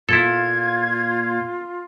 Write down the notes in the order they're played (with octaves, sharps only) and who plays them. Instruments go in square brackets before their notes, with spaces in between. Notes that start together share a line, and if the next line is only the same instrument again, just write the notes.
[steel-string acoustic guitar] A#2 [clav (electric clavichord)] E4 A4 [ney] F4 [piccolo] G#6